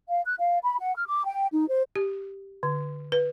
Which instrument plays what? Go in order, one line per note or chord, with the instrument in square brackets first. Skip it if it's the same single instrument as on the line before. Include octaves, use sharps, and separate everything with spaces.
[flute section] F5
F#6
F5
B5
F#5
F6
D6
G5
D#4
C5
[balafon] G4
D3
B4